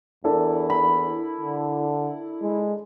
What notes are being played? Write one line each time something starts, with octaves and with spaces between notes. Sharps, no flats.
E2 D4 E4 A4 A#4
B5
D3
G#3